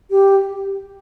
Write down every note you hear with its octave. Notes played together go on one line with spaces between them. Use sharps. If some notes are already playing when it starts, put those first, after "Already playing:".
G4